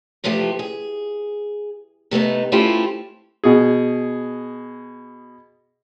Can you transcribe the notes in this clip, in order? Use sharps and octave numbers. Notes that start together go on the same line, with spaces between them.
C3 E3 F3 A3 F4 G4
G#4
C3 A3 B3 D#4
A3 C4 C#4 E4 F4 G4
B2 G#4